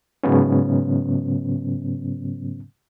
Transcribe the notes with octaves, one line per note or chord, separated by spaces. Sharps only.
G#2 C#3 F#3 B3 C#4